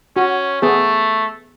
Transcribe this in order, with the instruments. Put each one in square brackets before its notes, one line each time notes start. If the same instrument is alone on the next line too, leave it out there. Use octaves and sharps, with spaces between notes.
[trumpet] C#4 [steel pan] F#4
[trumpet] A3 [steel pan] B3 G#4